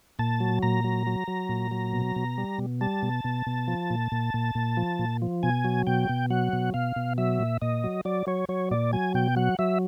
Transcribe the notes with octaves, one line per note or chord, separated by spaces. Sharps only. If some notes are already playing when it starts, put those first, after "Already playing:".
A#2 A5
F#3
A#2 A#5
F#3
F#3
F#3
A#2
F#3
B2
B2
G3
B2
G3 A5
B2
B2
B2
F3
A#2
A#2
A#2
A#2
F3
A#2
F3
B2 G#5
F#3
B2 G5
B2
F#3 F#5
B2
B2 F5
B2
F#3 E5
A#2
A#2 D#5
F#3
F#3 D5
F#3 C#5
F#3 C#5
A#2 D5
F#3 G#5
B2 G5
F#3 F#5
F#3 E5